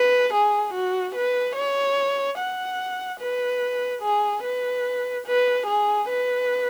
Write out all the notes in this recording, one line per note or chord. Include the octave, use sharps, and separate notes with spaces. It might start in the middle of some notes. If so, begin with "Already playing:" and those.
Already playing: B4
G#4
F#4
B4
C#5
F#5
B4
G#4
B4
B4
G#4
B4